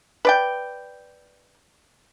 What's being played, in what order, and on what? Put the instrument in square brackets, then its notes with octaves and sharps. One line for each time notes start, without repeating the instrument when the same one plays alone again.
[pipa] B4 D5 G5